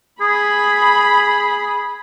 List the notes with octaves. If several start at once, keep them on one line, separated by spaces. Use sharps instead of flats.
G#4 B5